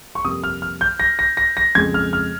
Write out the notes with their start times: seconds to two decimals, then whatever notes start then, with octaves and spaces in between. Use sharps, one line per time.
0.15 C#6
0.24 F2 C3 G3 A#3 D#6
0.44 F6
0.62 F6
0.81 G6
1.00 A#6
1.19 A#6
1.37 A#6
1.57 A#6
1.75 F2 C#3 G#3 G#6
1.94 F6
2.13 F6